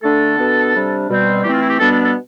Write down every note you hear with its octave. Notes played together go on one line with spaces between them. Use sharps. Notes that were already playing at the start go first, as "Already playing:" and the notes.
D3 A3 D4 A4
B2 B3 D4
C3 G3 D4
B2 G3 C4
E3 A3 C4 G4
F4
E4
G4
B2 G3 B3 D4 A4
A4
A4